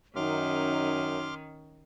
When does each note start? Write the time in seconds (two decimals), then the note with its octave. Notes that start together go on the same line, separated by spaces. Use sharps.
0.16 F#2 D#3 C#4 D#4 C6 D6 F6